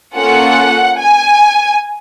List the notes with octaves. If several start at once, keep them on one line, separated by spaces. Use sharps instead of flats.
A#3 C#4 F4 A4 F#5
G#5